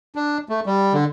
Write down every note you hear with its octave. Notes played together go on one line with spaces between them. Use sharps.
D4
A3
G3
D3